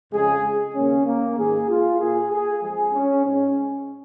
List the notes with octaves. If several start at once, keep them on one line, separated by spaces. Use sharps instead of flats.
F2 C#3 G#3 G#4
D#2 C#3 A#3 C#4
A#3
G#2 D#3 A#3 G#4
F4
A#2 A#3 G#4
G#4
F2 F3 G#3 G#4
C#4
G#2 G#3 C#4